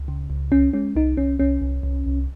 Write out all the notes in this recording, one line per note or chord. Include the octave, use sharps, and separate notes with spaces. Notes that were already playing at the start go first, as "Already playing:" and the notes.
Already playing: C#2
C#3
C#2
C2 C#4
G#3 C#4
C2 D#4
C2 C#4
C2 C#4
C2
C2
C2